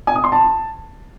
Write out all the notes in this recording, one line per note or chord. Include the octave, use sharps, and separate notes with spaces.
G#5
D#6
C6
A5